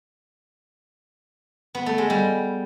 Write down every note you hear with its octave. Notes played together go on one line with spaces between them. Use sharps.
B3
A3
G#3
G3